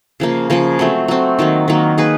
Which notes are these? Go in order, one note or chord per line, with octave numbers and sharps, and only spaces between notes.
C#3 F3 A#3
C#3 F3 A#3
F#3 A3 C4
F#3 A3 C4
D#3 F#3 A#3
D#3 F#3 A#3
A#3 D#4 G#4 B4